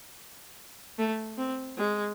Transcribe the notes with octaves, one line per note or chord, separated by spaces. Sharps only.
A3
C4
G#3